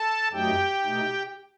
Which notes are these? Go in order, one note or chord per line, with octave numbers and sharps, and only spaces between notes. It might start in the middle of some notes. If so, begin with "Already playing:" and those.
Already playing: A4 A5
F#2 F#3 A3 D#4 G4 G5
B2 A3 D#4